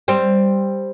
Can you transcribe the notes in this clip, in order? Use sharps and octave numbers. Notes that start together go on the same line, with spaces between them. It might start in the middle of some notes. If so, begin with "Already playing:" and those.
G3 C4